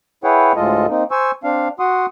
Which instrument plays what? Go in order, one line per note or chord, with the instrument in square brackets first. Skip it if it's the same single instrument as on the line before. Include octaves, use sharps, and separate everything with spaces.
[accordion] E4 G#4 B4 C#5 F#5 G5
D2 A2 G#3 F4 A4 D#5
A#3 C4 D#4
C5 G#5 C#6 E6
C4 D4 F5
F#4 F#5 C6 D#6